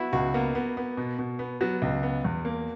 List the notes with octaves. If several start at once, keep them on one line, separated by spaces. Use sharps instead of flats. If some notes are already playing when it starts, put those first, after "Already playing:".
Already playing: B3 E4 F#4
C#2 F#4
A#3 B3
B3
B3
B2
B2
B3
F#3 B3
C#2
B3
E2
A#3